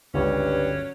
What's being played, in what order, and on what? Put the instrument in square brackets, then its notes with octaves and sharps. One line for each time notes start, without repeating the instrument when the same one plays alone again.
[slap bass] G1 [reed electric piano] C#2 [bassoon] G2 [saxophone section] F#3 C#4